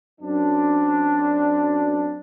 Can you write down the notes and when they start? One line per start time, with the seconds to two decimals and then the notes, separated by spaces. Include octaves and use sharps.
0.21 F#2 C4 D4